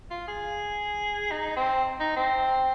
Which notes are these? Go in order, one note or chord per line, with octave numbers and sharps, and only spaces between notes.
F4
G#4
D#4
C4
D#4
C4